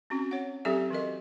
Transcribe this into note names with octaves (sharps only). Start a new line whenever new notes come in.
C4 C#4 F#4
C#5 F#5
F#3 C4 D#4 G4 A4 E5
E3 F#4 A#4 D#5